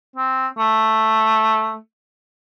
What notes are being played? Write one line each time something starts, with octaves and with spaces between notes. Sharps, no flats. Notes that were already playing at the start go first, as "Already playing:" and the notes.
C4
A3